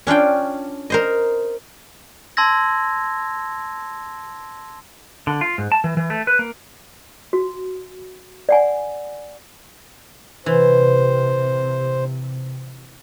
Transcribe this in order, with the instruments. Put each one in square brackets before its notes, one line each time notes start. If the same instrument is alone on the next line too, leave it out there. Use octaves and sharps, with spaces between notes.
[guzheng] C#4 D4 F4 G5
A#4 C5 D#5
[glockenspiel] A5 C6 E6 G#6 A#6
[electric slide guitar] D3
F4
G#2
A5
E3
E3
A3
B4
A#3
[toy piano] F#4
D5 F#5 G#5
[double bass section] C3 [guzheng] E3 [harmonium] C5